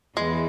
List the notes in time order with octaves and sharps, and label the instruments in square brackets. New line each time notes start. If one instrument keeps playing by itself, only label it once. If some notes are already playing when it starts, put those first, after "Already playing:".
[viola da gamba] E2 E3 [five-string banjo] G#3